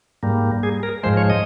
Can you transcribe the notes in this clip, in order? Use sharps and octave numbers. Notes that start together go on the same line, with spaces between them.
G#2 G3 A#3
G#4
A#4
G#2 F3 G#3 C5
C#5
D#5